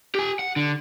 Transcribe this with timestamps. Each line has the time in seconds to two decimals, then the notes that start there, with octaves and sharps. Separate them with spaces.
0.15 G4 G#5
0.39 F#5
0.56 D3